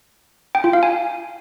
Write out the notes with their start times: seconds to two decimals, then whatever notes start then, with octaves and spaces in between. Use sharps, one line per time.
0.55 G5
0.64 F4
0.73 F5
0.83 G#5